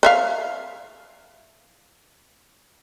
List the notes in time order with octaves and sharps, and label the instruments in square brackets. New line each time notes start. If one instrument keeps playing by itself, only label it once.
[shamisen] B4 E5 F5